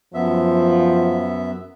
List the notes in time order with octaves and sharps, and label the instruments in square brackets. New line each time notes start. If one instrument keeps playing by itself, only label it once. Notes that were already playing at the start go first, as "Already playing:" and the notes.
[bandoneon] F#2 B3 E5 [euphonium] F3